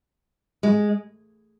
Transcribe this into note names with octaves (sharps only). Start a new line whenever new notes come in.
G#3